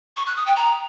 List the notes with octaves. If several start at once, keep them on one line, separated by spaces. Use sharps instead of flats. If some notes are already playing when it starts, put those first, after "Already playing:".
C#6
F#6
D#6
G5
A#5